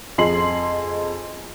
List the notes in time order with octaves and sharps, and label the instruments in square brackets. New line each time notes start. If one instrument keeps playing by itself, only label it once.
[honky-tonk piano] F2 G#4 D#5 C6 C7 F#7